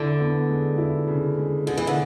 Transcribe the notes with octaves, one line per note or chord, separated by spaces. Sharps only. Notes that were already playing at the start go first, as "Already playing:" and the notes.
Already playing: D3 E4
B3
G#3
E4
C#3
G#3
D3 G#4
E3
D3